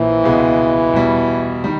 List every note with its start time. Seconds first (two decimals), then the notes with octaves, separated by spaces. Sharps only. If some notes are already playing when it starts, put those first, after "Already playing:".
Already playing: A#1 A#2 E3 F3 A#3
0.23 C#2 B2 G#3 B3
0.93 E2 B2 G3
1.64 D#3 G3